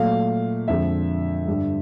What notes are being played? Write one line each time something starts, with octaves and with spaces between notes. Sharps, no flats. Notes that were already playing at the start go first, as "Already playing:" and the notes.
Already playing: A#2 F#3 A3 F5
F2 D3 F3 G#3 E5
G2 D3 G3